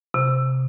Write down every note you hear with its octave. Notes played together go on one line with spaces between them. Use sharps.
C3